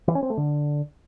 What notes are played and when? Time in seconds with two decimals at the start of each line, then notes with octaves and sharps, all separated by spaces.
0.08 E3
0.15 C#4
0.23 C4
0.30 A3
0.37 D3